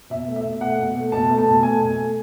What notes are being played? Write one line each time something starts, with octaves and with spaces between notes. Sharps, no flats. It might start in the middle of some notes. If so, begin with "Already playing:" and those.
B2 E5
A3
E5
B2
A3 F#5
B2
A3
B2 A5
A3
A5
B2
A3 G#5
B2
A3